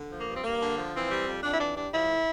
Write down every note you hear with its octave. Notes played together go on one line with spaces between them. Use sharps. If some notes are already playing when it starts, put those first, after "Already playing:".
Already playing: D3
F3
A#3
G2
C4
G2 A#3
D3
F3
E3 C4
G3
F2
F2 D4
E4
E3 D4
G3 D4
F3 E4
A2